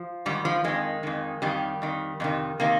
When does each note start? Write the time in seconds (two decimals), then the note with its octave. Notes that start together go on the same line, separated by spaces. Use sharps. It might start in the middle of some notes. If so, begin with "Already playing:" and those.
Already playing: F3
0.26 G#2 D#3 G3
0.45 F3
0.64 F2 D#3 G#3
1.03 F2 D#3
1.42 F2 D#3 G3
1.82 F2 D#3
2.20 F2 C3 D#3
2.60 C3 D#3 A#3